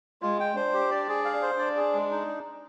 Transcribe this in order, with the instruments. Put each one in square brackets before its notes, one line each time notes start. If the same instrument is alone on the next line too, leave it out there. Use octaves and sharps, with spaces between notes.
[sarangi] G#3 [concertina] F4
[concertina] G5
[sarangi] D4 [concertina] C5
[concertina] G4
D5
G#4
F5
C5
[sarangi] D4 [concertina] D5
[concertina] G#4
G#3
D#4